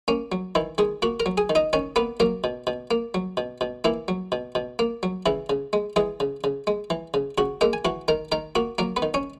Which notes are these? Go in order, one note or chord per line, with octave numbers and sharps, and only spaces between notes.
A#3 C#4
F#3
D#3 E3 E4
D#3 G#3 G#4
A#3 F#4 F#5
A#4 A#5
F#3
G#4 G#5
D#3
D#4 D#5
D#3 C#4 C#5
A#3 B3 B4
F#3 A#3 A#4
B2
B2
A#3
F#3
B2
B2
E3 A#3 E4
F#3
B2
B2
A#3
F#3
C#3 E3 E4
C#3
G#3
E3 G#3 G#4
C#3
C#3
G#3
E3
C#3
C#3 F#4 F#5
G#3 A#3 A#4
G#5
E3 F#4 F#5
D#3 A#4 A#5
D#3 A#4 A#5
A#3 F#4 F#5
F#3 A#3 A#4
B3 B4
D#3
C#4 C#5